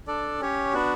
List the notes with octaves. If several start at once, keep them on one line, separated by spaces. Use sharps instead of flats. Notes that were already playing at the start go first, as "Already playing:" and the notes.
D4 A4 D5
C#4 G4 C#5
B3 D4 F#4